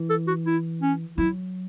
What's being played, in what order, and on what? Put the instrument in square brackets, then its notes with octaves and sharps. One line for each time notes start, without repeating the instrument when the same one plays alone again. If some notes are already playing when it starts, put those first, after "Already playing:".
Already playing: [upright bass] E3
[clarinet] A4
F#4
E4
C#4
[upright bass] F#3 [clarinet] E4